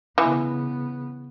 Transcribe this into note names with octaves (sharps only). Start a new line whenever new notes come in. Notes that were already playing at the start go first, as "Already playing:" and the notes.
C#3 E3 B3